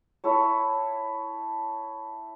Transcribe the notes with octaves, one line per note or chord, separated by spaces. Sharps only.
E4 A4 C#5